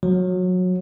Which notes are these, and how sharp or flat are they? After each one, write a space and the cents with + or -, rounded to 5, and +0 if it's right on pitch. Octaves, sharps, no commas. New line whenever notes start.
F#3 -20